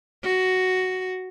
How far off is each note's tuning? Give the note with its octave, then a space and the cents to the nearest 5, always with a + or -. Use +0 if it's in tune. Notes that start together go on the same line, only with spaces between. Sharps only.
F#4 +5